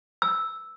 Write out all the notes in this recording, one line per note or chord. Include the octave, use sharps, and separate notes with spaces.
E6